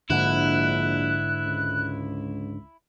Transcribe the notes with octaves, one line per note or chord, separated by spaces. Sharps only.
A#1 G#2 D3 E4 F#6
C#2